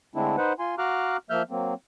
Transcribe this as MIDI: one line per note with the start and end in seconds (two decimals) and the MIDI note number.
0.15 0.36 50
0.15 0.36 56
0.15 0.36 57
0.15 0.36 60
0.15 0.36 62
0.15 0.36 64
0.37 0.53 63
0.37 0.53 71
0.37 0.53 72
0.37 0.53 78
0.59 0.75 65
0.59 0.75 80
0.59 0.75 84
0.78 1.17 66
0.78 1.17 77
0.78 1.17 82
0.78 1.17 86
0.78 1.17 89
0.78 1.17 90
1.30 1.42 53
1.30 1.42 58
1.30 1.42 76
1.30 1.42 89
1.30 1.42 91
1.50 1.74 54
1.50 1.74 58
1.50 1.74 60